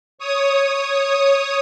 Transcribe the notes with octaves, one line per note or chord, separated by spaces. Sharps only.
C#5 D#6